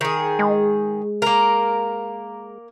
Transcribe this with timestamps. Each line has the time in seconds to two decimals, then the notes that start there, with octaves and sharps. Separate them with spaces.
0.01 D#3 G#4
0.39 G#3
1.22 A#3 A#4